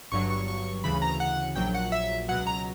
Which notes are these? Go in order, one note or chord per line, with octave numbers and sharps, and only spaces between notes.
G1 G2 F#3 C#6
C#6
C#6
D2 C#3 E3 B5
A#5
F#5
A#1 A#2 F#3 G5
F#5
E5
C#2 B2 F#3 F#5
A#5